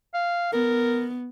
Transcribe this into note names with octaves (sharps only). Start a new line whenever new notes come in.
F5
B3 A#4